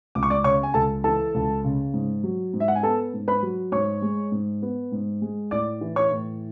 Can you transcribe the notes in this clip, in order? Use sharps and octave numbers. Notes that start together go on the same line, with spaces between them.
C#2 D6
C#6
D5 D6
C#3 C#5 C#6
G#5
C#2 A4 A5
E3 A4 A5
C#2
C#3
G#2
F#3
G#2
E5
F#5
G#5
B3 A4 A5
G#2
B4 B5
F#3
G#2 C#5 C#6
G#3
G#2
B3
G#2
G#3
A2 D5 D6
E3
C#5 C#6
A2